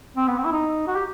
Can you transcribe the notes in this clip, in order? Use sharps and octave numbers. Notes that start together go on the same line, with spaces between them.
C4
B3
C4
E4
D#4
F#4
G4